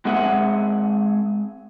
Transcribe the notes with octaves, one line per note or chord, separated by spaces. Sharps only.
G#3 C4 G#4 E5 F#5